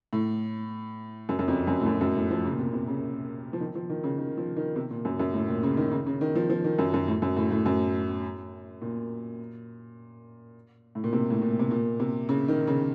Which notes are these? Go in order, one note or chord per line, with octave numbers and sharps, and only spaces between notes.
A2
F#2
F#2
F2
F#2
A2
F#2
F#2
A2
F3
C#3
A#2
C3
C3
C#3
F3
D#3
F3
D#3
C#3
D#3
F3
D#3
C3
A#2
F#2
F#2
A2
A#2
C#3
D#3
C#3
C#3
D#3
F3
F3
D#3
F#2
F#2
A2
F#2
A2
A2
F#2
A#2
A2
A#2
C3
A2
A#2
C3
A#2
C3
C#3
D#3
C#3